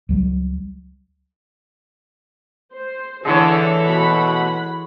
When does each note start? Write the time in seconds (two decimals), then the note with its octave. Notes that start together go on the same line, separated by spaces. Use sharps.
0.09 C#2 F#3 G3
2.73 C5
3.25 D3 E3 G#3 D4 E4 A4 C#5
3.85 B2 F#4 F#5 B5